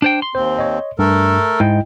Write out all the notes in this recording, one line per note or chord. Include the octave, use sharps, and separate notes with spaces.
D4 C5 G5
C6
D#2 C4 C5
C#5 D#5
G2 A3 A4 A#4
G#2 E4 D#5 G5